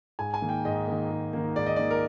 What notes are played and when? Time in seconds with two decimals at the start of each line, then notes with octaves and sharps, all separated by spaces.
0.19 G#2 G#5
0.34 G#5
0.42 D#3 A#3
0.49 G5
0.65 G#2 D#5
0.87 D#3 A#3
1.10 G#2
1.33 D#3 A#3
1.56 G#2 D5
1.66 D#5
1.76 D#3 A#3 D5
1.91 A#4